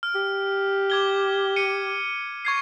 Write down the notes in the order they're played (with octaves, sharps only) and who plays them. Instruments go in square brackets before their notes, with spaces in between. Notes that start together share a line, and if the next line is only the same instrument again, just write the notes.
[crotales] F6
[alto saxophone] G4
[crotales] D6 G#6 G7
C#7 D#7
C#6 G#6 C7